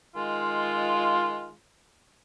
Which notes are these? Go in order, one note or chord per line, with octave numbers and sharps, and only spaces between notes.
D#3 G#3 F4